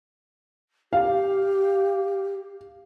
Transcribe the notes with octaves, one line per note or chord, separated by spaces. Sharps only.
G4 F5